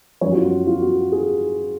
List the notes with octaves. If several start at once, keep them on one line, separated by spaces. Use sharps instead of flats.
F#2 F3 C#5
F#4
F4
F4
F#4
G#4